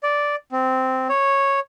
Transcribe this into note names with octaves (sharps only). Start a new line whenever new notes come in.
D5
C4
C#5